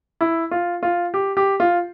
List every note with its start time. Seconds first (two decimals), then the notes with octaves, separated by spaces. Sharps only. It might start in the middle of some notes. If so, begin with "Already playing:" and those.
0.21 E4
0.51 F4
0.83 F4
1.14 G4
1.37 G4
1.60 F4